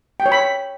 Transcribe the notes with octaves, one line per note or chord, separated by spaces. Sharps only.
G5
C#5
B5